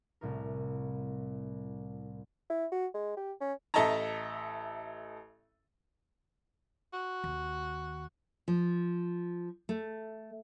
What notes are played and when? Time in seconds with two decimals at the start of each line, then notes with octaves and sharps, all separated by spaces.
0.21 C2 A2 A#4
2.50 E4
2.72 F#4
2.94 G#3
3.17 G4
3.41 C#4
3.74 A1 A4 D#5 E5 A5 A#5
6.93 F#4
7.24 D#2
8.48 F3
9.69 A3